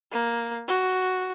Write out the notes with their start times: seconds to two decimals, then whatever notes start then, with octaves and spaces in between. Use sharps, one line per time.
0.12 A#3
0.68 F#4